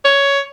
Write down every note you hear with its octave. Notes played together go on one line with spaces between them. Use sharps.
C#5